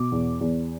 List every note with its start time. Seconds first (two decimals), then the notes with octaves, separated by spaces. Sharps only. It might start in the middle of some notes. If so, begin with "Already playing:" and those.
Already playing: B2 D6
0.12 E2
0.41 E2